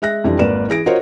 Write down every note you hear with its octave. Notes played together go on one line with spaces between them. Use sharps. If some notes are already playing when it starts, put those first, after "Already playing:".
G#3 E5 F#6 A#6
F2 E3 G3 D4
G#1 A#3 B4 D5 E7
E3 G#4 A#6 D7
F4 F#4 A#4 C5 C#5 D#5